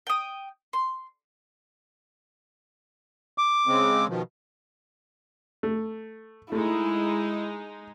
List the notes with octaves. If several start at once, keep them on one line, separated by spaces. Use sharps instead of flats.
G5 D#6
C6
D6
C#3 G#3 C4
B2 D#3 F3
A3
G#3 A3 D#4 E4